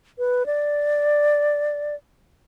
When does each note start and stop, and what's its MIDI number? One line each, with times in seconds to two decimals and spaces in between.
0.19 0.46 71
0.46 1.95 74